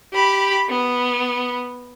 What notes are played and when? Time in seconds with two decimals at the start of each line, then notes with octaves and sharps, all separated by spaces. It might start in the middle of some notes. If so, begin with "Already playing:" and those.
0.13 G4 B5
0.69 B3